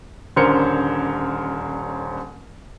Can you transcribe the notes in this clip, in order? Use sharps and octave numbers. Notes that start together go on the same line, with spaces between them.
D#1 D3 C#4 A#4 C5 C#7